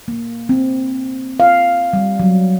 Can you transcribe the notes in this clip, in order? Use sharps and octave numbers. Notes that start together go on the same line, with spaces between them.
A#3
C4
F5
G3
F#3